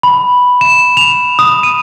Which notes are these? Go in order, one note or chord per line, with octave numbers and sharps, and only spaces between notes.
B5
E7
F7
D#6
D#7